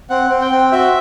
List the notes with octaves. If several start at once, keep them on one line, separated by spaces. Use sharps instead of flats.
C4 F#5
C4
G5
C4
F#4 E5